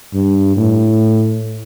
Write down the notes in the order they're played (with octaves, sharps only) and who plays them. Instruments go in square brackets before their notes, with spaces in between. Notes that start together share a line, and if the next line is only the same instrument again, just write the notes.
[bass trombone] G2
A2